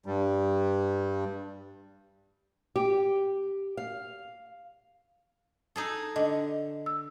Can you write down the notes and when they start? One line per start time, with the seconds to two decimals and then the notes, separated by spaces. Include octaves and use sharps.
0.06 G2 G3
2.76 G4
3.77 F5
5.76 D#4 G#4 A4
6.16 D3 D#5
6.86 E6